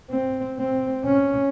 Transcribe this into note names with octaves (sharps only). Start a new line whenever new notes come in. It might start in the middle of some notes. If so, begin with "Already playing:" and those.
C4
C4
C#4